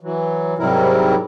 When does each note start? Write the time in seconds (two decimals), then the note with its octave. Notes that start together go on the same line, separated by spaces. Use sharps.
0.01 E3 F#3
0.58 G#2 C3 F#3 G3 E4 A#4